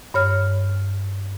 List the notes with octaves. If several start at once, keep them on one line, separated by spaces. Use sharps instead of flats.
G2 C#5 F6